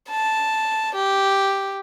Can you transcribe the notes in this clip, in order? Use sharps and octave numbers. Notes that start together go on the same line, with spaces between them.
A5
G4